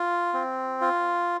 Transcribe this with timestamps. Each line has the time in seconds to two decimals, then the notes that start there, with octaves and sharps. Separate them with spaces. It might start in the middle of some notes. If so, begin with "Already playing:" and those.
Already playing: F4
0.34 C4
0.81 F4